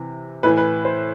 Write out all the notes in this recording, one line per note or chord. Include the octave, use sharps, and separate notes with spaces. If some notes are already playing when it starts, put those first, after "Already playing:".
Already playing: C3 E3
A2 E3 B4
B4
C5